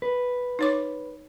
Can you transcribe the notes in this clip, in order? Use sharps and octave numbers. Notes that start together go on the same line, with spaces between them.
B4
D#4 C#5 D6